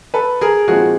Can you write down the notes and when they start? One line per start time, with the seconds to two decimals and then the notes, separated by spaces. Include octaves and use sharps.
0.14 A4 B4
0.41 G#4 A#4
0.68 A#2 F3 G#3 C4 D#4 F#4 G#4